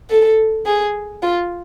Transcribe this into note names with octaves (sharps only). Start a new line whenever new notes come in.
A4
G#4
F4